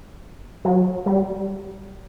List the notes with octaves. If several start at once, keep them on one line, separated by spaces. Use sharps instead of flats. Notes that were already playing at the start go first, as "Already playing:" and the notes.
F#3
G3